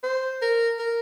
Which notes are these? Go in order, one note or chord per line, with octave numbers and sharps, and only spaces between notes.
C5
A#4
A#4